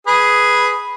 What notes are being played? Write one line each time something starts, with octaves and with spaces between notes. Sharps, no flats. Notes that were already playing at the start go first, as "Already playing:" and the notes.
G#4 B4